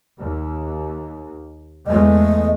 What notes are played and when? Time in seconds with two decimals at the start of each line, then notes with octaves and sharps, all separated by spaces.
0.19 D#2
1.87 E2 G#3 A3 D#5